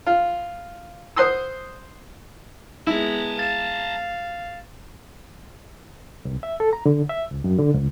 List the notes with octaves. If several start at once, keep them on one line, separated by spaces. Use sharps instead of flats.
F4
C5 F#5 C6 D#6 E6
G#3 B3 E4 A5 A#5
F5 A6 E7
C2
E5
A4
A#5
D3
E5
C#2
F#2
D3
C#2